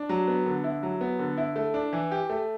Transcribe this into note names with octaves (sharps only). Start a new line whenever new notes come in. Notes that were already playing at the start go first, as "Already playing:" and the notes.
Already playing: D4
F#3
B3
D3
E4
F#3
B3
D3
E4
A3
D4
E3
G4
A3